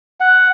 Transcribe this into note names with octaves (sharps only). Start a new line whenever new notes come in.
F#5